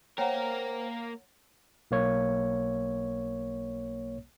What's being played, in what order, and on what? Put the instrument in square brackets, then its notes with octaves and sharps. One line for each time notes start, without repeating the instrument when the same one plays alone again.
[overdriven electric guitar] A#3 A#4 [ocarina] C5 [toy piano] C#5 F#5 [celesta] G5 A#5
[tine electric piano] B1 A#3 C#5